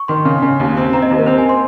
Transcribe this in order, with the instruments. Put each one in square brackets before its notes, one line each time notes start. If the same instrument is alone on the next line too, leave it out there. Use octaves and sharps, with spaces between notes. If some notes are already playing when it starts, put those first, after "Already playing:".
Already playing: [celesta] C#6
[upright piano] D#3 [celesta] C6
[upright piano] C#3
C#3
D#2
C4
[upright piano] C4 [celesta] A#5
[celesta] D#5
[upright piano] D#2
[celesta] A#4
[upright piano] C4 [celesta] C5
[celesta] G#5
C6